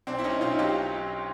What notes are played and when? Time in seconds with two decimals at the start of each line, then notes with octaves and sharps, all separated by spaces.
0.07 B1 C4 D4
0.18 E4
0.24 B1 C#4 D#4
0.41 B1 D#4 F4
0.58 F#3 F4 G4